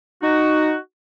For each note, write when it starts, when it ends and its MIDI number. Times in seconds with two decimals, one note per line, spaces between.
0.23 0.75 63
0.23 0.75 66